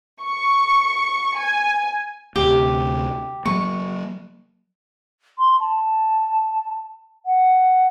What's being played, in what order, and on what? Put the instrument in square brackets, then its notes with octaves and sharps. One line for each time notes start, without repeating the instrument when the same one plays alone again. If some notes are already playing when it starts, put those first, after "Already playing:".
[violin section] C#6
G#5
[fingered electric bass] D2 C3 [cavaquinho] G4
[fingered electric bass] F#3 A#3 [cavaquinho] C#6
[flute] C6
A5
F#5